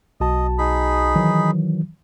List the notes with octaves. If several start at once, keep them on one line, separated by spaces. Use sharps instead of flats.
B1 F#4 D#5 A5
D#4 G#4 B5
D#3 E3 F#3